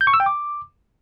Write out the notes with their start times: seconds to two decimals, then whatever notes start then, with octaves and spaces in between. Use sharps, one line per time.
0.01 G6
0.07 C#6
0.14 E6
0.20 G5
0.26 D6